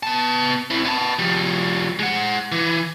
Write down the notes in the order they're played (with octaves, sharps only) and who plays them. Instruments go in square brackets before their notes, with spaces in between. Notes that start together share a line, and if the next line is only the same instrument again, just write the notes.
[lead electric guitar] B3 A5
C4 E4
B3 A5
F3 G3
G#3 F#5
E3